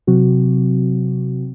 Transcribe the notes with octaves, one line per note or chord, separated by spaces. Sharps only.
C3 F#3 C4 F#4